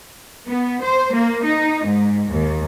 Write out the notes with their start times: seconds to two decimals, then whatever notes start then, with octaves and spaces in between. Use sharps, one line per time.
0.47 B3
0.82 C5
1.14 A#3
1.44 D#4
1.85 G#2
2.30 D#2